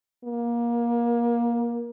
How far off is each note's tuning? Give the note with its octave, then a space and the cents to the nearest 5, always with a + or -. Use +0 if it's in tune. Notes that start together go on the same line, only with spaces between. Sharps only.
A#3 +25